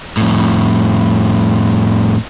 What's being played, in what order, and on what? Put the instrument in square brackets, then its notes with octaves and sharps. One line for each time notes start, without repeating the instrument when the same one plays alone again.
[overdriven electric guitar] F2 A2